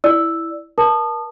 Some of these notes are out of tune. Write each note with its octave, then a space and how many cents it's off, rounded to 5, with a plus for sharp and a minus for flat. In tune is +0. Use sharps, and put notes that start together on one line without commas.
E4 +0 D5 +0 E6 +0
A#4 +35 A5 +0 D#6 -30